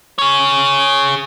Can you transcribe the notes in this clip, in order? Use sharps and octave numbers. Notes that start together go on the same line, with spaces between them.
G#4 C#5